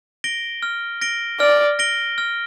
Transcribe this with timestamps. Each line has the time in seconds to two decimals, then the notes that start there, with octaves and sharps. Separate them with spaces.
0.24 A#6 D7 G7
0.63 F6
1.01 A#6 D7 G7
1.40 D5 F6
1.79 A#6 D7 G7
2.18 F6